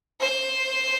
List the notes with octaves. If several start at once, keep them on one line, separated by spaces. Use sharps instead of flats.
C5